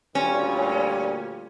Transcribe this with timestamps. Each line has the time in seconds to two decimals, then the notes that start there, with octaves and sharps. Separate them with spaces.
0.15 D2 A#2 G3 C#4